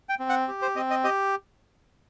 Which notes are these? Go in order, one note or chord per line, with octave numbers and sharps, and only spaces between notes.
G5
C4
F#5
G4
C5
C4 D#5
D#5
G4 D#5